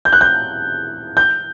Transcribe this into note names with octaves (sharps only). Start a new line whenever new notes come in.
G6
F#6
G6
G6